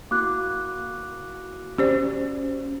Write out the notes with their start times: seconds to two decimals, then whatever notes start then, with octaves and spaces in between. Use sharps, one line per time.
0.11 A#3 E4 F#4 D6 F#6
1.78 C#4 G4 C5 D5